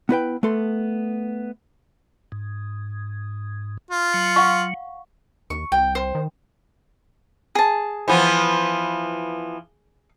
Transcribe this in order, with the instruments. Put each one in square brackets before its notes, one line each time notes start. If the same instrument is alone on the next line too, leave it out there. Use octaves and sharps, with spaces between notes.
[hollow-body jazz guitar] B3 E4 B4 G5
A3 B3 A4 C6
[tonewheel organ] G#2
[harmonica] F4
[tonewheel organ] F#3
[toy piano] F5 F#5 C#6
[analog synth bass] D#2 [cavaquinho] C#6
[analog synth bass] C2 [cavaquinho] G5
[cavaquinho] C5
[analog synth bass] D#3
[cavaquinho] G#4 A5
[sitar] E3 F3 B3